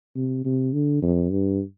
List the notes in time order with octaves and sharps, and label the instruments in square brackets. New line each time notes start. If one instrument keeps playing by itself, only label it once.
[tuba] C3
C3
D3
F2
G2